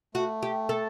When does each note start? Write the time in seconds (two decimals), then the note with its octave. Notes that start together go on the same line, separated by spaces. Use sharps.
0.14 A3 F#4
0.43 G4
0.69 A4